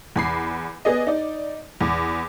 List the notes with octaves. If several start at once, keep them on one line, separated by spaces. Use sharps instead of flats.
E2 B5 C7
B3 G#4 D5 D#5
D#4 D5
E2